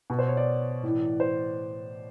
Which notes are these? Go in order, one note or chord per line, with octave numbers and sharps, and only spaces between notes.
B2
C5
C#5
D5
A2
E3
C5